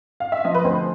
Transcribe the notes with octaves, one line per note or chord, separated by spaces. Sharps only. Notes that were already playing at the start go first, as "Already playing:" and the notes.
F5
E5
F3 D#5
B4
D2 C5